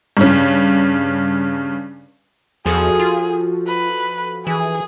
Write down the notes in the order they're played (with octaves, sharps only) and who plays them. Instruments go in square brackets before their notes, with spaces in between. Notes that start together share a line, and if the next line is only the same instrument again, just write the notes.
[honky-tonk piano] G2 C#3
[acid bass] E2 [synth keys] F3 F#4 A4 [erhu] G#4
[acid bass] F4
[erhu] B4
[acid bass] E3 [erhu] G#4